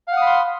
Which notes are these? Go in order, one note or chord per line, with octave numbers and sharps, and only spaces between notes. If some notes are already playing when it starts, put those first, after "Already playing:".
F5 F#5 B5 C6 D#6